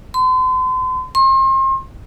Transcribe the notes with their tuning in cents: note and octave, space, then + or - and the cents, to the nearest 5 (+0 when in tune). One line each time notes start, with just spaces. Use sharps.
C6 -40
C6 +35